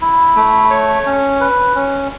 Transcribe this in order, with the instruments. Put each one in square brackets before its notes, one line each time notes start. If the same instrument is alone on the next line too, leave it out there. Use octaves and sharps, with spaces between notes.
[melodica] E4
A3
C#5
C#4
B4
C#4